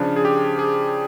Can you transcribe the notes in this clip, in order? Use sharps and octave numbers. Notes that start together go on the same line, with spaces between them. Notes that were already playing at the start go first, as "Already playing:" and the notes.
Already playing: C#3 F3 D4
G#4
G4
G#4